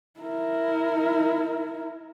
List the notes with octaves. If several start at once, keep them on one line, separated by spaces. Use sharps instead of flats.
E4 A#4